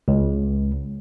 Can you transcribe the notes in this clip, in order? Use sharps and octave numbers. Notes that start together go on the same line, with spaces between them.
C#2